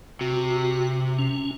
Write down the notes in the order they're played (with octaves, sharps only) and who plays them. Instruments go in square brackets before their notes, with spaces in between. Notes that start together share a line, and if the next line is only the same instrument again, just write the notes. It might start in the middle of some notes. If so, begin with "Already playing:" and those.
[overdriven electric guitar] C3 [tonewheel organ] F#4
[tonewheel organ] C#4